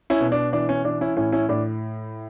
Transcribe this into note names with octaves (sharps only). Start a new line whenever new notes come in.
C#4 E4
B2
D4
E3 D4
C#4
E3 D4
C#4 E4
A2 C#4 E4
C#4 E4
A2 D4